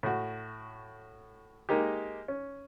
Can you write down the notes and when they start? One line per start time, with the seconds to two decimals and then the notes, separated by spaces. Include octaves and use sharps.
0.03 A2 F#4
1.69 G#3 A#3 D#4 G4
2.28 C#4